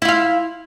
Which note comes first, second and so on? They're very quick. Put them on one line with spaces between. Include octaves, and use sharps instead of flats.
E4 F4 F5